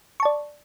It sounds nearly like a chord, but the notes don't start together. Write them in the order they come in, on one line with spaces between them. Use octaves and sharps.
C#6 A5 D5